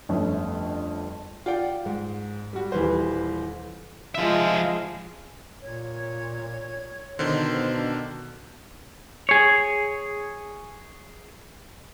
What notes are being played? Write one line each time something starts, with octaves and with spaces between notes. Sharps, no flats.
G1 F2 A3 C#4
F4 D5 F#5 G5
G#2
G3 F#4
D#1 E3 G3 B4 C5
F3 G#3 F4 E5
A#2 C#5 G#6
B2 D3 D#3 C5
D4
G#4 C#5